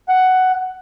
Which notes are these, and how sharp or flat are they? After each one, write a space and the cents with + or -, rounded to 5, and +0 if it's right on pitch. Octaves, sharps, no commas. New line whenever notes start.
F#5 +10